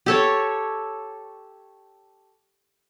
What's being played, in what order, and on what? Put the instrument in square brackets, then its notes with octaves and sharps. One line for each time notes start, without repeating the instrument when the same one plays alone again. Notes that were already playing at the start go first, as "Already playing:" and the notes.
[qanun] G4 A4 C#5